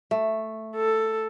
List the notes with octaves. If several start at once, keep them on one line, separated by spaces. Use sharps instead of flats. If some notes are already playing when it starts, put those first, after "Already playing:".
A3
A4